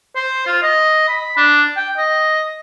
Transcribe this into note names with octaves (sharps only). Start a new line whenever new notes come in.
C5
F4
D#5
B5
D4
G5
D#5